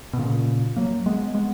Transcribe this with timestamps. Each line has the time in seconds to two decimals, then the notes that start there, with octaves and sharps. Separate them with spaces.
0.13 B2
0.19 A#2 C#3
0.76 F#3 A#3
1.06 G#3 B3
1.35 G#3 B3